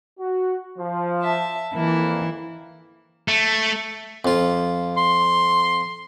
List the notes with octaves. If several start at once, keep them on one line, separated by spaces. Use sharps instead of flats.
F#4
F3
E5 A5
F2 E3 A#3 E4
A3
F2 F4
C6